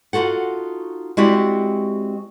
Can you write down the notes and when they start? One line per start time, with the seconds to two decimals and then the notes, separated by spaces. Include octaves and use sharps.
0.13 D#4 F4 F#4 A4 F#5
1.17 G#3 C4 E4 F#4 G4 D5